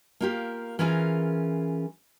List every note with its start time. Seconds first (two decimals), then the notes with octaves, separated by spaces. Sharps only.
0.21 A#3 F4 G4
0.79 E3 C#4 F4 G#4 A#4